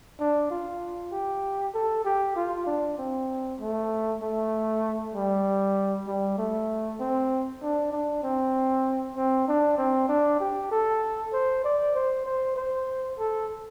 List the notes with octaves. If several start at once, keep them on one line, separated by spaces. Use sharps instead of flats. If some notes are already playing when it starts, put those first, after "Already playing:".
D4
F4
G4
A4
G4
F4
D4
C4
A3
A3
G3
G3
A3
C4
D4
D4
C4
C4
D4
C4
D4
G4
A4
C5
D5
C5
C5
C5
A4